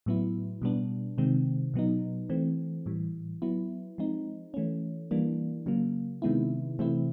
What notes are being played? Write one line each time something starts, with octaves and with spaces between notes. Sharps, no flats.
A2 F#3 B3 E4
B2 G3 B3 D4
C3 D#3 G#3 C4
B2 F#3 B3 D#4
E3 A3 C4
A2 E3 G3
F#3 B3 E4
F3 G#3 C4 D#4
E3 A3 C#4
E3 G3 A#3 D4
C#3 F#3 A#3
C3 D#3 G#3 B3 E4
C3 E3 A3 C4 E4